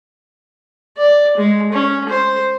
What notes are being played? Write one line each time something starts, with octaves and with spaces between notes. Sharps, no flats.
D5
G#3
C#4
C5